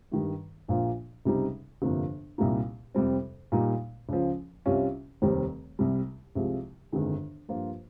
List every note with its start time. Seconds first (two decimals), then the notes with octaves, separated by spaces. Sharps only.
0.12 G2 D#3 G3
0.68 A#1 A#2 F3 A#3 F4
1.25 C#2 C3 G3 C4 D#4
1.82 G1 F2 C3 F3 A#3
2.38 C2 A#2 G3 A#3 D#4
2.95 F2 C3 G3 C4
3.52 A#2 G3 A#3 D#4
4.09 C#2 C#3 F3
4.65 C2 C3 G3 C#4 F4
5.22 F1 D#2 D#3 G3 C4
5.79 C2 C3 G3
6.35 C2 C3 F3 G#3
6.92 G1 F2 D#3 G#3
7.49 G2 F3 A#3 F4 C5